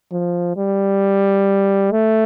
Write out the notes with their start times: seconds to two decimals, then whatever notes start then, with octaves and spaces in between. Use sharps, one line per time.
0.12 F3
0.57 G3
1.91 A3